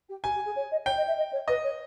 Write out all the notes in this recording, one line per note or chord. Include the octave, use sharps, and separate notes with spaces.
G4
G4 G#5
G4
G#4
C#5
D#5
C#5 G5
D#5
E5
D#5
C#5
B4 D#5
C#5